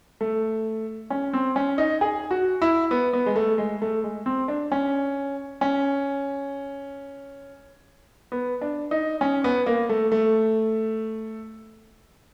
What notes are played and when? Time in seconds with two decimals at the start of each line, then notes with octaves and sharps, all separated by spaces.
0.21 A3
1.10 C#4
1.33 C4
1.56 C#4
1.78 D#4
2.01 G#4
2.31 F#4
2.62 E4
2.91 B3
3.13 B3
3.26 G#3
3.36 A3
3.58 G#3
3.82 A3
4.04 G#3
4.26 C4
4.48 D4
4.72 C#4
5.61 C#4
8.32 B3
8.62 D4
8.91 D#4
9.21 C#4
9.44 B3
9.66 A#3
9.89 A3
10.12 A3